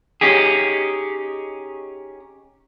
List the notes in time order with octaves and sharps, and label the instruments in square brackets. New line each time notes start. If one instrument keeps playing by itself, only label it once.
[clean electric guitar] C#4 D#4 G4 G#4